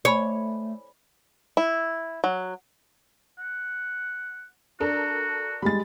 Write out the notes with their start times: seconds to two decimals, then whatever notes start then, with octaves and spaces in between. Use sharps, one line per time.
0.05 A3 C#5 D5 G#5 B5
1.57 E4
2.24 F#3
3.39 F#5
4.80 D4 F#4 A4 A#4
5.62 G3 G#3 B5 A6